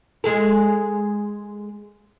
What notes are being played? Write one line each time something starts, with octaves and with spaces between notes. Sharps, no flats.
G#3 G#4 A4